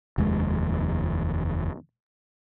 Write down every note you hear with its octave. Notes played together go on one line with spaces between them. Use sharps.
F1 D#2 G#3